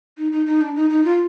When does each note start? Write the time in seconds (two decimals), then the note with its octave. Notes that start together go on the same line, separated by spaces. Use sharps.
0.18 D#4
0.32 D#4
0.46 D#4
0.61 D4
0.75 D#4
0.90 D#4
1.05 F4